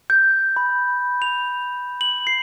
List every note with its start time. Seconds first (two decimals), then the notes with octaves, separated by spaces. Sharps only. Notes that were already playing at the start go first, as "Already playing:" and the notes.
0.10 G6
0.56 B5
1.22 F7
2.01 F#7
2.27 C7